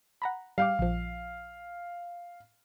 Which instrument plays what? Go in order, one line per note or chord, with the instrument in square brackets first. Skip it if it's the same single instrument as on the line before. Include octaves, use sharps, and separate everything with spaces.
[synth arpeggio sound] F#5 A#5 B5
[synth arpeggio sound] G3 G5 D6 [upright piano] F5
[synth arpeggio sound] A#1 F3